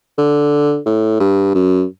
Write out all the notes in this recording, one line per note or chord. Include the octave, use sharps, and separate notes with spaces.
D3
A2
G2
F#2